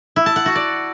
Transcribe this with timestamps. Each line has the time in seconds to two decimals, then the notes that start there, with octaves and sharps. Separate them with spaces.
0.16 E4
0.26 A5
0.36 F#5
0.46 F#4
0.56 D5